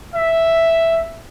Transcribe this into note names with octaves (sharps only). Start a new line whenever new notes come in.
E5